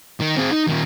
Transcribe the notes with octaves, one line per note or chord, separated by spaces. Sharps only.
D#3
C4 G#4
D#4
A#2 D#3